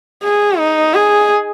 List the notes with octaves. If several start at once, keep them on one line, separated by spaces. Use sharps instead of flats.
G#4
D#4
G#4